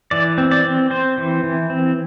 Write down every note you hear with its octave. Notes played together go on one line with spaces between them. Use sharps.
E3 D5
C4
D5
C4
C4 C5
E3
E3
C4